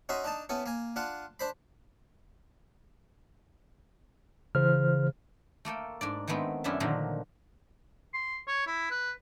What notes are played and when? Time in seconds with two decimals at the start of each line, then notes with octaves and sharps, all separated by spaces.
0.09 C#4 D#4 F#4 E5 C6
0.24 D4 D#4 A5
0.49 B3 C#4 E4 A4
0.66 A#3 G#5
0.96 D4 F4 F#5
1.39 D4 C5 B5
4.55 C#3 E3 C5 F6
5.65 A3 A#3 A4 G5
6.01 G#2 D4 D5
6.27 D#3 G#3 A3 B3 C4
6.64 F#2 C#4 D4 E4 A4 E5
6.80 A#2 D3 D#3 F3 F#3
8.14 C6
8.48 C#5
8.67 E4
8.90 B4